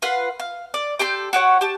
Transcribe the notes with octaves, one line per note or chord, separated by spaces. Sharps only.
F4 B4 F5 F#5
F5
D5
G4 A4 C6 G6
F#4 G4 C#5 F#5
G4 A5